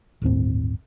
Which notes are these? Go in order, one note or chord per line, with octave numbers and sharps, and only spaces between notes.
G1 D#2 A2 C4